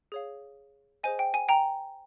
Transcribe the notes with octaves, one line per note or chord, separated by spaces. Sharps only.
G#4 C#5 F5
G#4 C5 D#5 G#5
G5
G#5
G5 A#5